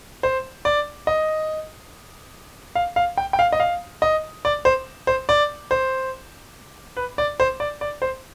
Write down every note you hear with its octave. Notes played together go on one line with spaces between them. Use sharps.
C5
D5
D#5
F5
F5
G5
G5
F5
D#5
F5
D#5
D5
C5
C5
D5
C5
B4
D5
C5
D5
D5
C5